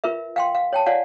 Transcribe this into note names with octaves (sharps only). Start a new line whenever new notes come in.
F4 A#4 B4 E5
F5 G5 C6
F5
C#5 G5 A5
F4 C#5 D5 F5 F#5 G#5